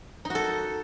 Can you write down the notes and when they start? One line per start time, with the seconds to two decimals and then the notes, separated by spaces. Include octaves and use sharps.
0.25 D#4
0.30 F#4
0.35 A4